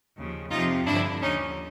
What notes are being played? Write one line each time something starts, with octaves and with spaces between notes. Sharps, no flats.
D#2 C#3 F3
F2 C3 F3 D#4 F4
G2 D3 F3 D4 E4
D#2 D3 F3 C#4 D#4